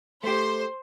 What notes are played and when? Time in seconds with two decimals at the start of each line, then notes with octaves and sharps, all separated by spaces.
0.24 A3 G4 C5